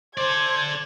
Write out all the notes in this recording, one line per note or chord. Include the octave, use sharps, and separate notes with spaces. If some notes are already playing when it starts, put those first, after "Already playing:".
A4 C5 D5 G#6